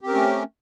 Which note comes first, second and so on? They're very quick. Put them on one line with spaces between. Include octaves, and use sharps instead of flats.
G4 C4 A#4 C#4 A3